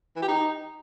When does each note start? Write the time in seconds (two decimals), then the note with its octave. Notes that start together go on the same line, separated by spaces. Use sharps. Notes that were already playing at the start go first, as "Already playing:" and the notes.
0.16 E3
0.22 G4
0.28 D#4